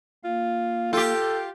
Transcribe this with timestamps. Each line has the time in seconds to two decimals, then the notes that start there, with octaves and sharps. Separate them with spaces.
0.24 A#3 F4 F5
0.93 F4 G4 A4 G5